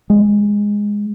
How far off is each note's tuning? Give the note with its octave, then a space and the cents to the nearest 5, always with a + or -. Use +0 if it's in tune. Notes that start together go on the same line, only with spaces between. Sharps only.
G#3 -10